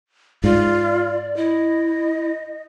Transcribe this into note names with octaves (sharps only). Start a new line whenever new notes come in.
G#2 F4 D5
E4 D#5